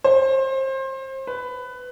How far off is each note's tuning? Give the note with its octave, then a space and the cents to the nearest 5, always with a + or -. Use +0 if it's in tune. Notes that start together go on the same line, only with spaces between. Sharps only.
C5 +30
B4 +15